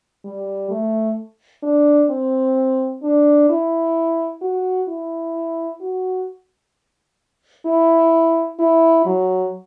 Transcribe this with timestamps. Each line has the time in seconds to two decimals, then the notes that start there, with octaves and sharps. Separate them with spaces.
0.24 G3
0.70 A3
1.63 D4
2.10 C4
3.03 D4
3.49 E4
4.41 F#4
4.88 E4
5.81 F#4
7.66 E4
8.59 E4
9.06 F#3